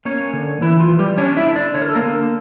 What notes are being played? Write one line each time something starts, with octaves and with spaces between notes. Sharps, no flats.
A#3 C#4 C#5
D3
E3 E4
F4
E3
G3 G4
C#4 D4 C#5
E4 E5
D3
D4 D5
D3 C#5
A#4
A4
A#3 A#4
D3